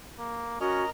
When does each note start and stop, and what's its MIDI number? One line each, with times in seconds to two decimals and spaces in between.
0.19 0.60 58
0.61 0.86 61
0.61 0.85 66
0.61 0.90 70
0.61 0.90 75
0.61 0.90 82